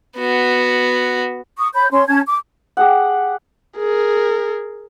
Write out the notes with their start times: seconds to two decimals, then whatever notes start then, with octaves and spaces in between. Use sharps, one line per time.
0.17 B3 F#4
1.57 C#6 D#6
1.74 C#5 B5 G6
1.91 C#4 C#5 C6
2.07 C#4 A5 G#6
2.27 D6
2.77 G4 G#4 F#5
3.78 G#4 A#4